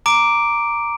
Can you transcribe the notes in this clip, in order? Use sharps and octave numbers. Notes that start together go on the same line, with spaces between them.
A#5 D6 D7